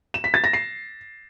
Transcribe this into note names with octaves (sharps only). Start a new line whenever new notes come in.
E7
B6
A6
A#6
C7